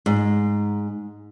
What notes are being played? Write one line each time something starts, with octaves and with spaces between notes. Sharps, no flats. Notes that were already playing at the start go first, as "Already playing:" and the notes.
G#2